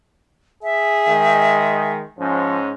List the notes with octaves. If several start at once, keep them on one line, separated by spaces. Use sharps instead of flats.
G#4 E5
D#3 G#3
G#2 F3 C#4